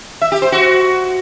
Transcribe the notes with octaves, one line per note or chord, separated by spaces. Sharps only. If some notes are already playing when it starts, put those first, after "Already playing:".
E5
G4
C5
F#4